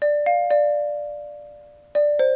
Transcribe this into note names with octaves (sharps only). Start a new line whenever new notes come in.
D5
F5
D5
D5
C5